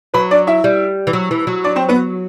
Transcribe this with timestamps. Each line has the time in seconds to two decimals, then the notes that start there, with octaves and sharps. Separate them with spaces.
0.14 F#3 B4 B5
0.31 D4 D5
0.47 E4 E5
0.64 G3
1.07 E3
1.13 F#3
1.31 E3
1.47 F#3
1.64 D4 D5
1.76 C4 C5
1.89 B3 B4